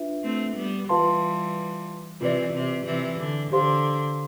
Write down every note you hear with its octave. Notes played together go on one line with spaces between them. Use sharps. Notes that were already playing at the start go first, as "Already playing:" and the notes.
Already playing: D4 F4 B4 E5
A3 C4
G3 B3
E3 G3 F4 B4 F5 A5 C6
C3 E3 F4 B4 D5
C3
C3 E3
D3
D3 G4 C5 F5 C6